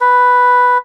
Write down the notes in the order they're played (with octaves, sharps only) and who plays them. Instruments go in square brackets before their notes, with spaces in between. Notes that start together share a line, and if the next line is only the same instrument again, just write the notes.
[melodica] B4